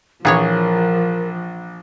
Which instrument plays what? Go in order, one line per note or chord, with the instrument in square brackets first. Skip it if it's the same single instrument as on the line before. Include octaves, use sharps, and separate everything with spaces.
[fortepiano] A#1 [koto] E3 G#4 C#5 [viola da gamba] F3 [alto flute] A#4